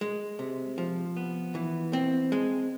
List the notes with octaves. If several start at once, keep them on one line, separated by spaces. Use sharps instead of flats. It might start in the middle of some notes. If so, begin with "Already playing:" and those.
G#3
C3
F3
B3
E3
C4
G#3